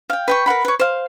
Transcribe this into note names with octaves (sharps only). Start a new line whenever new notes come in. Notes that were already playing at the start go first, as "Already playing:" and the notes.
F5 G5
B4 G5 C#6
A#4 B4 F#5 B5
B4 C#5
C5 F5